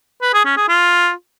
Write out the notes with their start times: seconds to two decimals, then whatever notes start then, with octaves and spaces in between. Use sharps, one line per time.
0.22 B4
0.33 G#4
0.45 C#4
0.57 G#4
0.68 F4